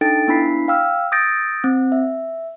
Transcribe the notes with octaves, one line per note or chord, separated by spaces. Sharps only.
D4 D#4 A4 G5 A6 D7
B3 D4 E4 B5 B6 C7
F5 G5 E6 F6
D#6 E6 G6 A6 A#6 D7
C4
E5